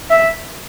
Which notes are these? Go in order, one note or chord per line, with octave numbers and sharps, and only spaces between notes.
E5